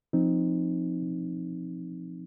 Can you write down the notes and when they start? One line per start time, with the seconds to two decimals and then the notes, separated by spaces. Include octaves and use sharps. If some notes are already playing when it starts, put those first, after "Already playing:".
0.13 F3 C4 D#4